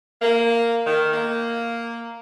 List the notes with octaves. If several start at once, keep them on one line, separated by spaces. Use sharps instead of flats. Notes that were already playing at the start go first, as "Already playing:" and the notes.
A#3
D#3
A#3